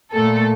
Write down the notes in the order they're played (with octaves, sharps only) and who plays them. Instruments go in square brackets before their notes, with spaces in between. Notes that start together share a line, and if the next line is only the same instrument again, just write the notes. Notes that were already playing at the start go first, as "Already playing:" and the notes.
[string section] A#2 A3 A4